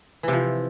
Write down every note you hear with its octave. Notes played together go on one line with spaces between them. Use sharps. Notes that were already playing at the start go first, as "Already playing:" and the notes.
C3 E3 F3